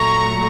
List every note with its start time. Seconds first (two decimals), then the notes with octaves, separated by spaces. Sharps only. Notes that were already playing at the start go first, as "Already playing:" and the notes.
Already playing: A#2 F#3 A3 A#5 C#6